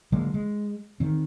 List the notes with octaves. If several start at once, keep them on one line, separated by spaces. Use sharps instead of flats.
D3 F#3 G#3 A#3
G#3
D#3 C4